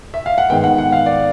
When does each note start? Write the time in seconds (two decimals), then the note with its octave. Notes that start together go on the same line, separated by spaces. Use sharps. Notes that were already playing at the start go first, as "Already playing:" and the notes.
0.14 E5
0.26 F5
0.38 F#5
0.50 G#2 D#3 G#3 B3 G5
0.64 F#5
0.78 F#5
0.92 F5
1.06 D5